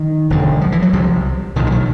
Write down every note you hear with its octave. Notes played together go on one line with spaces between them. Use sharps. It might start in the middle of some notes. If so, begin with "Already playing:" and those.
Already playing: D#3
E1 D2 D3
F3
E3
F#3
C2 C3 F3
B1 A#2 D#3
D3
D#3